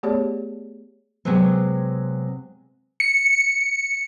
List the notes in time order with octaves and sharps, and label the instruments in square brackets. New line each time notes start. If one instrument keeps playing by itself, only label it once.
[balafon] A3 B3 G4 G#4 C#5 D5
[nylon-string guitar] C3 F#3 G#3 B3 C4
[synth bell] C#7